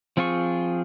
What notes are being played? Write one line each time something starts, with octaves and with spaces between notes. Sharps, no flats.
F3 C4 F4 G#4 C#6